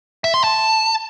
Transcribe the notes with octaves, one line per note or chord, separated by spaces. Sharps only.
E5
C6
A5